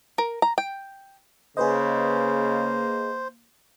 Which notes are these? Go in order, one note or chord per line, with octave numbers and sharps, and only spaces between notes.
A#4
A#5
G5
C#3 A#3 G#4 B4 C5 D#5